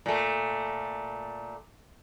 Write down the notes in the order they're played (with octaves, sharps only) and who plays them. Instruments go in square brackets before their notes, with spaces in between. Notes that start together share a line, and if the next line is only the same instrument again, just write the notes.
[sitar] A#2 A3